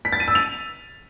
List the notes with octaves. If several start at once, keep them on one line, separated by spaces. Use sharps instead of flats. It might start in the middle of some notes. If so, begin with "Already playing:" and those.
B6
A6
D#7
E6
F7